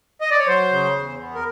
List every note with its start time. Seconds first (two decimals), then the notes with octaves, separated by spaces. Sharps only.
0.21 D#5
0.31 D5
0.39 C#5
0.47 F#3 C5
0.72 C#3
0.96 E2
1.20 B3
1.35 A#4